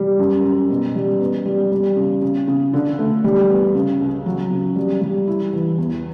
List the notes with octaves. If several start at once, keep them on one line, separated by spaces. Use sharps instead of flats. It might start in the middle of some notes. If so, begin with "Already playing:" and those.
Already playing: G3
F#2
F#2
B2
G3
B3
G3
G3
C#3
C#3
C#3
D3
A3
G3
B3
C#3
C#2
F#3
C#3
G3
G3
E4
E3
E2